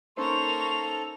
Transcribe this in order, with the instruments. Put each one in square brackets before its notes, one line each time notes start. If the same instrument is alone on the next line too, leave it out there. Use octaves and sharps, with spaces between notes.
[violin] A#3 F7 [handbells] C#4 D#4 C5 [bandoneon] A4 [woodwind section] C6 C#6